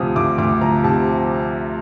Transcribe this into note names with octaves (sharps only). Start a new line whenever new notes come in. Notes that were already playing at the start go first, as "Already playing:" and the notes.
Already playing: D2 C3 F3 D#6
D2 D6
D2 D6
F3 A#5
C3 A5